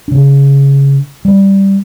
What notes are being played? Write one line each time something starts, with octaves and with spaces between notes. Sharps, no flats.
C#3 D4
G3